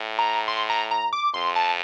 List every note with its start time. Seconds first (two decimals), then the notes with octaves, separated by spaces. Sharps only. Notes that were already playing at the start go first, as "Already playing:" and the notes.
Already playing: A2
0.19 A#5
0.48 C6
0.70 A#5
0.91 A#5
1.13 D6
1.34 F2 C6
1.56 A5